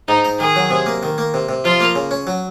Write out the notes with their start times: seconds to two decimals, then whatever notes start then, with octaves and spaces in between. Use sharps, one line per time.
0.08 G#2 D#4
0.25 D#4
0.40 D#3 G#4
0.56 F#3
0.71 C3
0.86 A#3
1.03 D#3
1.18 A#3
1.34 C3
1.49 C3
1.65 F3 F4
1.80 A#3
1.96 C#3
2.11 C#4
2.27 F#3